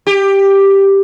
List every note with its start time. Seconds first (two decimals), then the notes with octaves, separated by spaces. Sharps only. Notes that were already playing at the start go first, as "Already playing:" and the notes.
0.07 G4